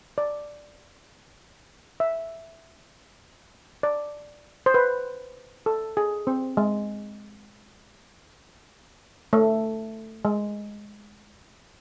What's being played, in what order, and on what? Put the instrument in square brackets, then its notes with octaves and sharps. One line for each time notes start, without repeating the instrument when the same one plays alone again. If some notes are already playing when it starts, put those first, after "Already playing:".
[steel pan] D5
E5
D5
C5
B4
A4
G#4
C4
G#3
A3
G#3